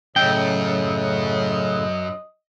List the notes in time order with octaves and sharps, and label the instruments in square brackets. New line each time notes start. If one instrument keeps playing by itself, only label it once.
[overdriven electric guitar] F#2 [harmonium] A2 C#3 [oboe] D#5 [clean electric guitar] G5